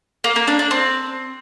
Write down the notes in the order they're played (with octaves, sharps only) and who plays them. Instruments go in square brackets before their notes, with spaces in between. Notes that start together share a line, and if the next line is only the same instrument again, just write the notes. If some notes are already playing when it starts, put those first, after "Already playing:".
[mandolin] A#3
A#3
D4
D4
C4